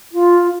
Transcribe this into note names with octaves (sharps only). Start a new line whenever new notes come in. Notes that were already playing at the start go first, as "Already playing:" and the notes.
F4